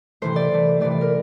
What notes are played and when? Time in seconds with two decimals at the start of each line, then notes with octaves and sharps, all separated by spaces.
0.22 C3 E3 A3 C5
0.36 D5
0.51 C3 E3 A3
0.81 C3 E3 A3 D5
0.91 D5
1.01 A#4